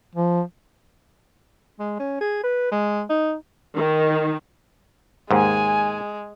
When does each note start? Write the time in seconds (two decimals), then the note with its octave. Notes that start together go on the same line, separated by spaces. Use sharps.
0.15 F3
1.79 G#3
2.00 C#4
2.21 G#4
2.44 B4
2.72 G#3
3.10 D#4
3.75 D#3
5.31 D#2 G#2 G#3 G#5